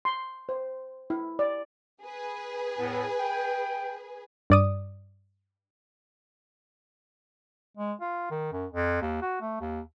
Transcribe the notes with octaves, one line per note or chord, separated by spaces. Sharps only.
C6
C5
E4
D5
G#4 B4
E2 A2 B3
G5
G2 D5 D#6
G#3
F4
D#3
F#2
F2
D#2
F#4
A3
D#2